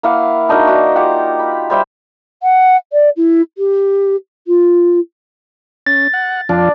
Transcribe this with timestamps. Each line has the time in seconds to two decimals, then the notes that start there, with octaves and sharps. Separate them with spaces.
0.03 A#3 E4 F5 F#5
0.49 D4 D#4 F#4 A#4
0.66 D#4 F#4 E5
0.96 F4 G4 F#5
1.39 B5
1.70 G3 C5 E5
2.43 F#5
2.92 D5
3.16 E4
3.58 G4
4.47 F4
5.86 C#4 A6
6.13 F#5
6.49 F2 F3 D4 F4